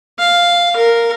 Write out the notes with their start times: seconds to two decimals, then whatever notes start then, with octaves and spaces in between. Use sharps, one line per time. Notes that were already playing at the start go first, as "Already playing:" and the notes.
0.19 F5
0.77 A#4